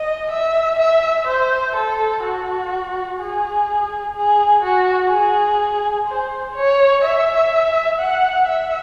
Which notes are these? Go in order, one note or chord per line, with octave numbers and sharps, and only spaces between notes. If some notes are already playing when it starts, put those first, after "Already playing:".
Already playing: D#5
E5
E5
C5
A4
F#4
G#4
G#4
F#4
G#4
C5
C#5
E5
F#5
E5